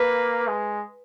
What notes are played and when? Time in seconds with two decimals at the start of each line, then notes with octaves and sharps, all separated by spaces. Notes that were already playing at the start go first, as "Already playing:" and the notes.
Already playing: A#3 B4
0.48 G#3